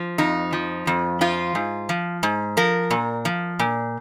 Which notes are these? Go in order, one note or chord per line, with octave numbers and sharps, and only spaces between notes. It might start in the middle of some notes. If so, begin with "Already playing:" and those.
Already playing: F3
F2 D#4
F3
F2
F3 F4
G#2
F3
G#2
F3 A#4
A#2
F3
A#2